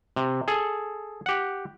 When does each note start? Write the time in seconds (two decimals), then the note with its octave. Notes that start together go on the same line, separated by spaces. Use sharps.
0.16 C3
0.48 G#4 A4
1.26 G4 F#5